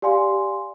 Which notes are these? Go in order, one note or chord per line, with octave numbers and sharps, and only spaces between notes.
G4 D5 F5 G#5 C6